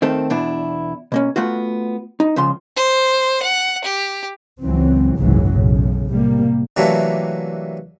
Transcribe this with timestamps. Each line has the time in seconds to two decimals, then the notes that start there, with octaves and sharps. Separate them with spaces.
0.02 D#3 A3 C4 A4
0.30 E2 B2 D4 E4
1.12 B2 A#3 C#4
1.36 A3 B3 F4 F#4
2.20 D#4
2.36 C#2 C#3 F3 C6
2.76 C5
3.43 F#5
3.84 G4
4.62 C#2 E3 F#3 C4
5.17 F#1 C2 G#2 C#3 E3 F#3
5.49 B1 A2 C#3
6.10 C3 G3 A#3
6.76 C3 E3 F#3 A3 A#3 D4